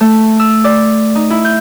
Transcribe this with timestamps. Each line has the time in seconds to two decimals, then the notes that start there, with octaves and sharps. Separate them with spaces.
0.01 A3
0.40 E6
0.64 D5
1.15 D#4
1.30 E4
1.45 G6